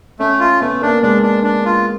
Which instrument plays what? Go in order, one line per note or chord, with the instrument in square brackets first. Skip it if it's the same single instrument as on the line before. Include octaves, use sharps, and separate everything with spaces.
[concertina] A3 [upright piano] C#4
[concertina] F4
[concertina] A3 [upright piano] B3
[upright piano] A#3 [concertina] D4
[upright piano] G#3 [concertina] D4
[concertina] D4
D4
F4